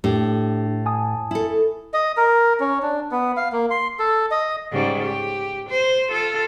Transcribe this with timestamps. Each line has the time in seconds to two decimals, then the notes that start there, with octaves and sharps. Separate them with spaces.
0.04 A2 D4 G4
0.86 G#5 A5 D#6
1.31 E4 A4
1.94 D#5
2.17 A#4
2.60 C#4
2.83 D4
3.11 B3
3.37 F5
3.52 A#3
3.71 C6
3.99 A4
4.31 D#5
4.72 G#2 C#3 G3
5.03 G4
5.69 C5
6.10 F4 A4